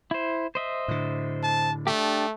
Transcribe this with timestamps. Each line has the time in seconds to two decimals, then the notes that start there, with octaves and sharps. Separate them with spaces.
0.11 E4 C5
0.55 C5 D#5 E5
0.88 A2 D3
1.43 A5
1.87 A3 D4 G4